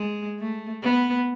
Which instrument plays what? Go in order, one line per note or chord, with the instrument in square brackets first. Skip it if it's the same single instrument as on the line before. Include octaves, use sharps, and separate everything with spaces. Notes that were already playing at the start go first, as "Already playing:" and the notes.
Already playing: [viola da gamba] G#3
A3
B3